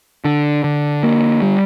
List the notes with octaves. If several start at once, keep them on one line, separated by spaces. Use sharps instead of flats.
D3
D3
A#3
G3